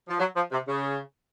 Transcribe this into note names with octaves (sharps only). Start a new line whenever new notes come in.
F3
F#3
F3
C3
C#3